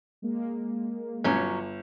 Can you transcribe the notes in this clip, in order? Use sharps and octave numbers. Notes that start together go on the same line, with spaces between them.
G#3 A#3
G1 F#3 C#4